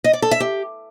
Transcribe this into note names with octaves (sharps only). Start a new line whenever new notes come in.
D#5
D5
A4
E5
G4